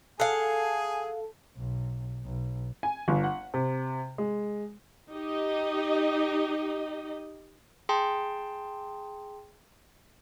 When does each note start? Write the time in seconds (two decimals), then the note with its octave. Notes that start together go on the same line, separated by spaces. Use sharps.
0.20 G#4 A4 F5 F#5 G#5
1.57 B1
2.24 B1
2.83 G#5
3.08 G1
3.24 F#5
3.54 C3
4.18 G#3
5.11 D#4 G4 D#5
7.89 G#4 G5 A5 C6